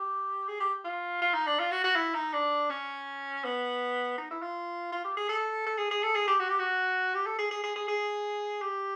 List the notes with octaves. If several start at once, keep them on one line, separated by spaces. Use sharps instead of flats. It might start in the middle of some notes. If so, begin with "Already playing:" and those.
Already playing: G4
G#4
G4
F4
F4
D#4
D4
F4
F#4
F#4
E4
D#4
D4
C#4
B3
D#4
E4
F4
F4
G4
G#4
A4
A4
G#4
G#4
A4
G#4
G4
F#4
G4
F#4
G4
A4
G#4
G#4
G#4
G#4
G#4
G4